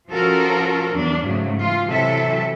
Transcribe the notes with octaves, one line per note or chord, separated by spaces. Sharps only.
F3 C#4 F4 F#4 A4 A#4
E2 F#3 D4
G#2 C#3 F#3 A3
E3 F4
C3 E3 F#3 A4 E5